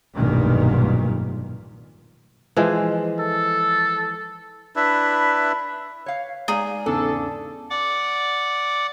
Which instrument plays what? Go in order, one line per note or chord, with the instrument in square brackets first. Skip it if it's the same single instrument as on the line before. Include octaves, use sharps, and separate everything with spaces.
[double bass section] F1 B1 G2 A#2 D#3
[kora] E3 F3 G#3
[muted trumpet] A4
[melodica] D4 E4 B4 E5
[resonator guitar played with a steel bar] C#5 F5
[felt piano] G#3 D5 F5 [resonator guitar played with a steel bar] D#4 [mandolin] G#4
[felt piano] E2 G#2 C#3 [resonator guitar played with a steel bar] D4 [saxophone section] A4
[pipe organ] D5 F#5 D6